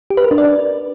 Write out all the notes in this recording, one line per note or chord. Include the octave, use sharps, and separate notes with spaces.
G4
B4
A#4
D4
D5